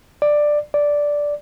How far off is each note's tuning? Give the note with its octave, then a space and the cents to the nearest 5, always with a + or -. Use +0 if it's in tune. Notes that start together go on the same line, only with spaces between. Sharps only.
D5 +10
D5 -5